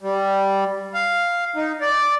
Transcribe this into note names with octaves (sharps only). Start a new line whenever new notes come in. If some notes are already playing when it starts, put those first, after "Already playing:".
G3
F5
D#4
D5